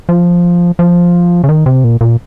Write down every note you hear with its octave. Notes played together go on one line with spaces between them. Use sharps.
F3
F3
C#3
D#3
C3
A#2
A#2